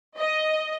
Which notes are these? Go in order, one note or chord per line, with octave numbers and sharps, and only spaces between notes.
D#5